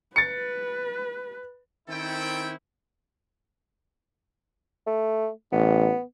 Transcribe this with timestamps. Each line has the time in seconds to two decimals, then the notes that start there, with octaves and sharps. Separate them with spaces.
0.16 B4 A6 C#7
1.89 D#3 C4 C#4 E4 A4 G5
4.87 A3
5.52 A1 B3